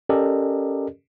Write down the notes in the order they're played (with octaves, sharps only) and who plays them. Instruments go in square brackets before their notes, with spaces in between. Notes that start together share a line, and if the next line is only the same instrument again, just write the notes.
[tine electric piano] C#4 G4 A4 A#4 D5 D#5